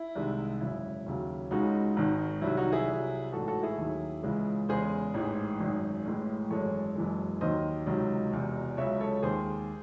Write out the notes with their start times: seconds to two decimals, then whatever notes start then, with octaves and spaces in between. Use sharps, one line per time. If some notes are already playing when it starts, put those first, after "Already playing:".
Already playing: E4
0.15 C2 C3 D#3 G#3
0.61 G#1 F#2 C#3 E4
1.06 D#2 C#3 F#3
1.51 C#2 C#3 G#3 D#4 F#4
1.96 G#1 G#2 D#3
2.42 C2 C3 D#3 F#3 E4
2.57 D#4 F#4
2.72 E4 G#4
2.87 C2 C3 F#3
3.32 A1 G#2 E3 F#4 A4
3.48 F#4 A4
3.63 E4 G#4
3.78 D#2 D#3 F#3
4.23 C#2 C#3 E3 G#3
4.69 E2 C#3 G#3 G#4 C5
5.14 A1 G#2 E3
5.60 G#1 F#2 D#3
6.06 A1 A2 E3 G#3
6.50 G#1 F#2 E3 G#3 A4 C#5
6.95 F#1 F#2 E3 G#3
7.41 D#2 D#3 F#3 C5 D#5
7.87 C#2 C3 D#3 F#3
8.31 E1 E2 C3
8.77 C#2 C#3 F#3 C#5 E5
9.00 A4 C#5
9.23 D#2 D#3 G#3 G#4 C5